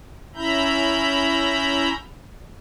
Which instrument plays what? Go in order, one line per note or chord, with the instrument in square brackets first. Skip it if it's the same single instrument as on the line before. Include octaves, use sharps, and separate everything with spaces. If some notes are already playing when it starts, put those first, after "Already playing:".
[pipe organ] C#4 E4 E5 A#5 B5 G6